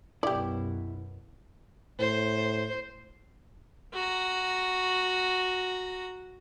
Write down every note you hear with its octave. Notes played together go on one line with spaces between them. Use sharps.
B1 F#2 B2 E4 G4 D5
A2 C5
F#4 A#5